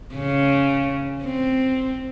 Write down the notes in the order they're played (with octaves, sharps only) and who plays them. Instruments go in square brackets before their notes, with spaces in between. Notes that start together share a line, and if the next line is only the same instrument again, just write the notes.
[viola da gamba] C#3
C4